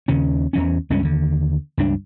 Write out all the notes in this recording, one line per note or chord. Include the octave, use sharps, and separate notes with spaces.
D#2 C#3 C#4
E2 E3 C#4
C#2 G2 G#3 C#4
D#2 D3
C#2 G2 D4